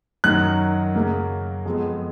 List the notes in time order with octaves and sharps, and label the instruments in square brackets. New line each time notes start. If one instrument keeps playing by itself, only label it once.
[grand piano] F#2 D#3 F#3 F#6
F#2 C#3 F#3 A#3
F2 F3 G#3 B3